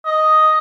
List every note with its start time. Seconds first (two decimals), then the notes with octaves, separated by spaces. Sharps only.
0.06 D#5